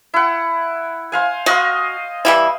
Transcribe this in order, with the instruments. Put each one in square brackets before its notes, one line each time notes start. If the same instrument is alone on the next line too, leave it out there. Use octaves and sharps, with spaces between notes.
[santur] E4 F#5
C5 F5 G#5
[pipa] F#4 [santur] D#5 F5 C6
[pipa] E3 G3 E4